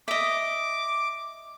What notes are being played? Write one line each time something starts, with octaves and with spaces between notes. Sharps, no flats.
D#5 E5 D6